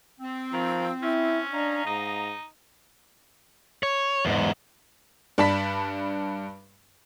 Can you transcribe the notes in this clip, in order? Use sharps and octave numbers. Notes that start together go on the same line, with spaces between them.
C4
D#3 F3
C#4 E4
D4 D#5 F5 A#5
G#2 D#4
C#5
E2 G#2
G2 D4 A5 B5 B6